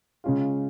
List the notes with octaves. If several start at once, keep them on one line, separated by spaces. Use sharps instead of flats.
C#3 G#3 C#4 F4